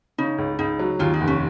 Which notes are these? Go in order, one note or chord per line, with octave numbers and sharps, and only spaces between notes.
C#3 D#4
C#2
C#2 D#4
F#3
D#2 F4
D#4
F1
C#4